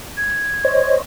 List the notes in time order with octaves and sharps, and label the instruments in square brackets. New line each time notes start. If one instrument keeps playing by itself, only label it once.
[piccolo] G#6
[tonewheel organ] C5 C#5 D#5